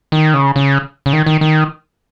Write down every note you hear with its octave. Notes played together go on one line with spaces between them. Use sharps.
D#3
C#3
C#3
C#3
D#3
D#3
D#3